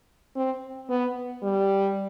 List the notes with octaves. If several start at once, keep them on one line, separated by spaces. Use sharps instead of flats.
C4
B3
G3